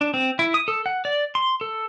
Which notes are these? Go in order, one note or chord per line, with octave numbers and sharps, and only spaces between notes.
D4
C4
E4
D#6
A4
F#5
D5
C6
A4